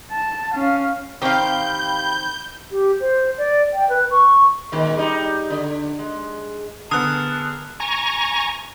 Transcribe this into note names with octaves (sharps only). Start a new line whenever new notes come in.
A5
C#4 F5
D#3 C4 G4 F5 B5 G6
G4
C5
D5
G5
B4
C#6
A#2 D#3 G#3
G3 D#4
D3
G#3
D3 B3 G#4 A#4 A5 D#6 F#6
G#5 A#5 C#6